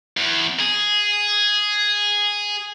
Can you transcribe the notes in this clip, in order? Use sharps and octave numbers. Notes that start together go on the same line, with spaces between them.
E2
G#4